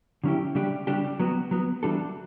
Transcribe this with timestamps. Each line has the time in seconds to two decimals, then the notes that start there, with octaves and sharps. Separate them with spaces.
0.24 D3 F#3 C#4 E4 G4
0.55 C#3 G3 D4 G4
0.87 C#3 G3 D4 G4
1.20 F#3 B3 F#4
1.51 F#3 B3 F#4
1.83 E3 G3 D4 F#4 A4